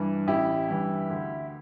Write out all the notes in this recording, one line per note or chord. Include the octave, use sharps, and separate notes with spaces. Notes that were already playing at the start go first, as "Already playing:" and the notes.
Already playing: G2 E3
A1 E4 G4
G2 E3
D2